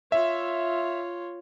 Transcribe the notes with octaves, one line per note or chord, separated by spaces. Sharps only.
F4 C#5 E5